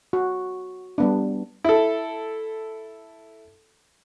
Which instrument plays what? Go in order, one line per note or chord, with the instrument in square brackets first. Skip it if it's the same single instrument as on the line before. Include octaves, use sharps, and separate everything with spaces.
[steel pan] F#4
G3 B3 D4
[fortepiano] E4 A4